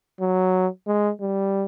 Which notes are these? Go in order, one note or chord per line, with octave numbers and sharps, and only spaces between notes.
F#3
G#3
G3